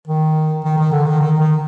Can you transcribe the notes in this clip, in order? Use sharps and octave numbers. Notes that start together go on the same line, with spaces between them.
D#3
D#3
D#3
D3
D#3
D#3
D#3